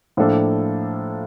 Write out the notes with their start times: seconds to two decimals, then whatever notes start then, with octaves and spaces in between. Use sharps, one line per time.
0.17 A2 F3 A#3 D4 A4